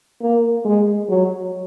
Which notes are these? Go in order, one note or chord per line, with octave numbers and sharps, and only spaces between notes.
A#3
G#3
F#3